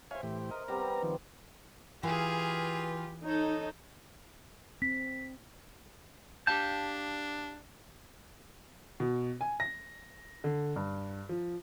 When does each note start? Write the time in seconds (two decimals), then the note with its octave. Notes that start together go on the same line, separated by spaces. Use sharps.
0.11 C5 C#5 E5 F5 G#5
0.23 A2 E3 G4
0.51 A#4 D#5
0.68 G3 B3 C4 A#5
1.03 D#3 F3
2.03 E3 F4 G4 G#4 B4 F5
3.25 D#4 A4 C#5
4.82 C4 B6
6.47 D4 G4 F5 G5 A5 G6
9.00 B2
9.41 G#5
9.60 A#6
10.44 D3
10.76 G2
11.29 F3